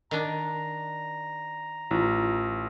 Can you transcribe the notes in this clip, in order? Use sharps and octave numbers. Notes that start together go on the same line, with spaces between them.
D#3 D4 A#5
A1 E4 F4